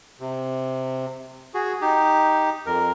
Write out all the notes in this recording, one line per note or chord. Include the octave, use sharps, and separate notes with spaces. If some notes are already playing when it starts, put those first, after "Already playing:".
C3
F#4 G#4
D#4 G4
F2 A#4